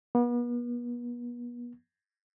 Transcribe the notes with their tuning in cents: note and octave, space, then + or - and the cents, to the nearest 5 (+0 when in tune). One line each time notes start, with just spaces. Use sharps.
B3 -40